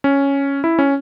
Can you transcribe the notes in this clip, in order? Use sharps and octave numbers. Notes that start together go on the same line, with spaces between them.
C#4
E4
C#4